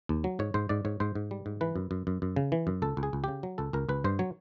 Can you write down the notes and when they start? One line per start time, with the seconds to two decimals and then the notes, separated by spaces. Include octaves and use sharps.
0.09 D#2
0.24 F#3
0.39 G#2 C#5
0.54 G#2 C5
0.69 G#2 D5
0.85 G#2 C#5
1.00 G#2 C5
1.15 G#2
1.31 G3
1.46 G#2
1.61 E3 B4
1.76 F#2
1.91 F#2
2.07 F#2
2.22 F#2
2.36 C#3
2.52 E3
2.67 F#2
2.82 C#2 A4
2.97 C#2
3.03 G#4
3.13 C#2
3.24 C#3 G4
3.43 F#3
3.58 C#2 A4
3.73 C#2 A#4
3.89 C#2 B4
4.04 G2 C5
4.19 F#3 C#5